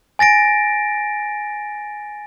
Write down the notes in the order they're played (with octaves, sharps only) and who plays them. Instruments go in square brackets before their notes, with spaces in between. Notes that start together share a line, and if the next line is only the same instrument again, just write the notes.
[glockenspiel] G#5 A6 A#6 D7